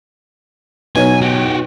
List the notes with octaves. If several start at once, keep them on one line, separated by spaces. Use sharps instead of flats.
B2 F#3 B3 D#4 G#5
F#4 G4